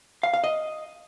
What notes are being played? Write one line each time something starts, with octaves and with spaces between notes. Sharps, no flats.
F5
F5
D#5